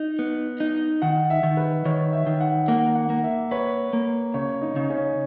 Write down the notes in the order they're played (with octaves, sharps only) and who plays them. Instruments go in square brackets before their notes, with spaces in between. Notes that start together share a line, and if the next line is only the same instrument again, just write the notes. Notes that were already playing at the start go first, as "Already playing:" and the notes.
Already playing: [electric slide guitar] D#4
B3
D#4
[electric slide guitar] D#3 [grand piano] F#5
[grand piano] E5
[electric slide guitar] D#3
[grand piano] B4
[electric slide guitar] D#3 [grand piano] C#5
[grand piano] E5
[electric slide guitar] D#3
[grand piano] F#5
[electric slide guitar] A#3 [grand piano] F#5
[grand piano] F#5
[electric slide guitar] A#3
[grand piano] E5
[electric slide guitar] B4 [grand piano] C#5
[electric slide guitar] A#3
[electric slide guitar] C#3 [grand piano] C#5
[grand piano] D#4
[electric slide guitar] C#3
[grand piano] C#4